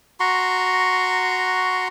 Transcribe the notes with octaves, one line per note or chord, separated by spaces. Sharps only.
F#4 A#5 C6 C#6